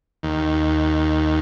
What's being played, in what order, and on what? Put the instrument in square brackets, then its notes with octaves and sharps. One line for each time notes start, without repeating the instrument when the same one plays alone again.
[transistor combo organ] D#2